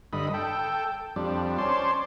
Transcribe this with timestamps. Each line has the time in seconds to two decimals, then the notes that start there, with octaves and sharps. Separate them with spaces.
0.13 G2 D3 D#5 B5
0.34 A4 G5
1.16 F2 G3 D4
1.58 C#4 C5 D5 A5 C6